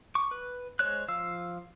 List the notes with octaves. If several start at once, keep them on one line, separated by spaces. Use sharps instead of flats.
C#6 D6
B4
G#3 C5 C#5 F#6
F3 F5 E6